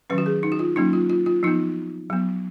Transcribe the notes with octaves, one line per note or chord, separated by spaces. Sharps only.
D#3 F#3 C#4 B4
F#4
G#4
D#4
F#4
F4
F#3 A#3 C#4 D#4
F4
F4
F4
F3 B3 D#4
F#3 B3